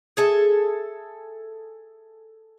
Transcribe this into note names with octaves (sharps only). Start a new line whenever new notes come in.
G#4 A4 E5